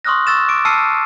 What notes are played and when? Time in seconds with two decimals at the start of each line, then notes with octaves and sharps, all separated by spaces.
0.05 C6 C#6 D#6 F6 F#6 A#6
0.27 C#6 E6 A6 E7
0.48 D6 A6 D7
0.65 A5 E6 F6 C7 C#7 D#7